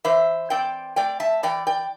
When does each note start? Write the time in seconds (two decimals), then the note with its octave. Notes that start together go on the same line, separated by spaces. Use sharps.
0.04 E3 C5 E5
0.50 C4 D5 G5
0.96 A3 D5 G5
1.20 E5 A5
1.43 E3 D5 G5
1.67 D5 G5